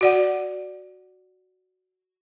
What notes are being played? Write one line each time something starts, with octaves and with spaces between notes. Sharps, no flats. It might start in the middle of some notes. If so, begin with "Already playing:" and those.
F#4 D5 F#5